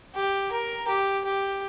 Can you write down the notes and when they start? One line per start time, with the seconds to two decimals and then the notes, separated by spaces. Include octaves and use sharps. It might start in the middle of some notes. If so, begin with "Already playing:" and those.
0.15 G4
0.52 A#4
0.88 G4
1.25 G4